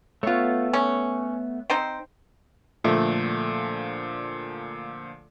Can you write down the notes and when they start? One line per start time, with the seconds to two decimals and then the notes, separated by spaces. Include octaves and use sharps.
0.23 A3 B3 F4 C#5
0.73 C#4 C#5
1.70 C4 D#4 C5 G5
2.84 A#2 D3 F3 A3